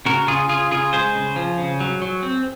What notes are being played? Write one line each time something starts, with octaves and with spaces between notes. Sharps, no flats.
C#3 F#4 A#4
C#3 F4 G#4
C#3 F4 G#4
C#3 F4 G#4
G#3 G#4 C5
C#3
F3
C#3
F#3
F#3
C4